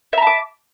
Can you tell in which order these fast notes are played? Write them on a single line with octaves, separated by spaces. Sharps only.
E5 A#5 A5 D6